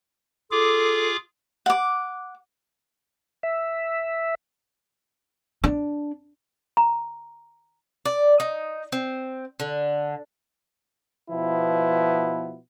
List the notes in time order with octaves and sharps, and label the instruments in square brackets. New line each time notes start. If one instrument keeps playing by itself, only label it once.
[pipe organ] F4 G#4 D6 [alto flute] A4
[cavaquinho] F#5 D6
[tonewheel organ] E5
[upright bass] D4
[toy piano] A#5
[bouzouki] D5
D#4
C4
D3
[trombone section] B2 F3 B3 E4